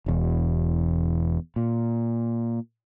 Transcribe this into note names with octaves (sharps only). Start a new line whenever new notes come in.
E1 E2
A#2